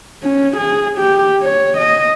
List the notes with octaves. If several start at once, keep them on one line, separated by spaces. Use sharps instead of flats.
C#4
G#4
G4
C#5
D#5